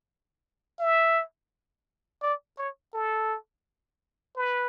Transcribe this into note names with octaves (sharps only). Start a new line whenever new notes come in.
E5
D5
C#5
A4
B4